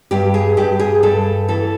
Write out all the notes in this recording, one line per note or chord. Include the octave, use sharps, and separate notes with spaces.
G2 G4
G#4
G2 G4
G#4
G2 A4
E3 A4